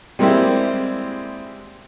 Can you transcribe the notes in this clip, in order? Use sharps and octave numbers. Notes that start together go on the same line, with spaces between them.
G3 G#3 A#3 C4 E4 G4